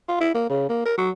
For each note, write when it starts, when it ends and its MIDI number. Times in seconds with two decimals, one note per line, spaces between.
0.08 0.17 65
0.20 0.32 64
0.34 0.47 58
0.49 0.67 49
0.69 0.82 58
0.85 0.96 70
0.97 1.10 54